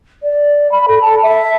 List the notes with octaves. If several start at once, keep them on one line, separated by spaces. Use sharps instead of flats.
D5
B5
A4
A5
E5